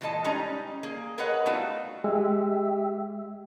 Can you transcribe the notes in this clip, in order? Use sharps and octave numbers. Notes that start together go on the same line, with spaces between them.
A#2 E3 G#3 A4 D#5 A5
G3 G#3 C#4 D#4 A#5
A#3 G#4
G#4 A#4 B4 C#5 D#5 F#5
G3 A3 B3 D#4 F4 F#4
G#3 G4 E5